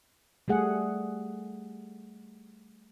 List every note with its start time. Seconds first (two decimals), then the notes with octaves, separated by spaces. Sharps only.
0.48 G3 A3 G#4 F#5